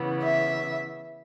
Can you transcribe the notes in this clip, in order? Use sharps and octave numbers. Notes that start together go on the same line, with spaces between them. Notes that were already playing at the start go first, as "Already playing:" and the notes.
Already playing: C#3 E3 B3
E5